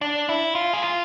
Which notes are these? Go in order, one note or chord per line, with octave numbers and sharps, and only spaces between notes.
D4
E4
F4
G#4
F4